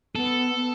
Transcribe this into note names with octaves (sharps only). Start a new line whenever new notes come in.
B3 A4
B3